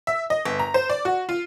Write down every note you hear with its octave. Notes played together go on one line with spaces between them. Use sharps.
E5
D#5
G1
A#5
C5
D5
F#4
F4